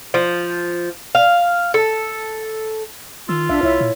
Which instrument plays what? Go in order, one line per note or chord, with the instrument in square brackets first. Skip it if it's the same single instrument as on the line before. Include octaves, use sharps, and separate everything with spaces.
[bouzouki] F3
F5
A4
[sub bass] D#3 [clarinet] F4 [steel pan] E6
[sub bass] B1 [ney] D4 [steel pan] E5 F5
[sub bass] C2 [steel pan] E4 E5 [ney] C#5
[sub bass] A#2